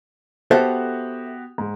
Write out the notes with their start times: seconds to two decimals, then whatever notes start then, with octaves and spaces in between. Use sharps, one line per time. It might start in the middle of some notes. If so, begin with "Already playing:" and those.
0.51 B3 F#4 G4 A4 C5 E5
1.58 G#2